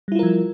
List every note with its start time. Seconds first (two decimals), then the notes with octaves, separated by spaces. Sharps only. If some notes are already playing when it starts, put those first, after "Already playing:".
0.08 G3
0.12 E4
0.15 F4
0.19 A#4
0.23 F3